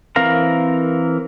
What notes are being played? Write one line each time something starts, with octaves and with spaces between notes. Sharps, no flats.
E3 C4 A#4 F5 A#5